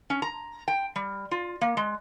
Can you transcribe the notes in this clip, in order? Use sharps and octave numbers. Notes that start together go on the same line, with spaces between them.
C#4
A#5
G5
G3
F4
A#3
G#3